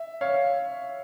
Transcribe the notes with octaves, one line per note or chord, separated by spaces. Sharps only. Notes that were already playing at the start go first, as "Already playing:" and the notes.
Already playing: E5
C#5 F5